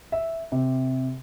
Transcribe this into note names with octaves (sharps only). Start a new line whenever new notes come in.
E5
C3